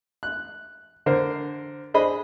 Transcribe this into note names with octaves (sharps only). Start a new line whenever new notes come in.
F#6
D3 A#4 C5
D4 G#4 C5 D#5 B5